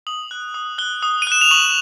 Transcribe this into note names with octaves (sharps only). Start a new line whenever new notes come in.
D#6 F#7
F#6
D#6
F#6 G7
D#6
D#7
F#6 E7
F7
C#6 F#7